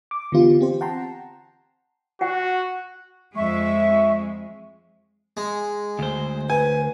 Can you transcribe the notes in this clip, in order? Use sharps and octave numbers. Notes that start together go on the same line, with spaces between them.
D6
D3 E3 B3 F4 G4
C4 G4 C5
F#5 G5 A5 A#5 C6
F#4 F#5 G5
F2 G#3 E5 C#6
G#3
D2 C5
B4 G#5